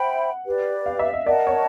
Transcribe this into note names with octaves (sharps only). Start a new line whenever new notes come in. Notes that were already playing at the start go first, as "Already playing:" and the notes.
Already playing: C5 E5 F#5 G5 B5
G4 B4 D5
F5
E5
D#5
A#4 D5 D#5 F#5 A5
C#5